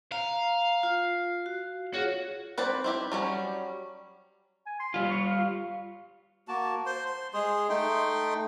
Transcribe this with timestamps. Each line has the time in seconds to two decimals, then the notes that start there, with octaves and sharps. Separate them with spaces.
0.12 F5 A#5
0.83 F4
1.46 F#4
1.94 F4 F#4 G#4 C#5
2.58 C4 B4 C5 D5
2.84 C4 E4 G4
3.12 F#3 G3 C#4
4.66 G#5
4.80 C6
4.94 G3 F4 F5
5.11 C#6
5.26 F5
6.48 A#3 F#4 A5
6.86 C5 C6
7.06 C6
7.34 G#3 G#4 C6
7.69 A3 D#4 G5 C6